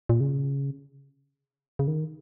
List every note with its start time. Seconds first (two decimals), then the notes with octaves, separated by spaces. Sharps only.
0.09 A#2
0.20 C#3
1.79 C#3
1.88 D#3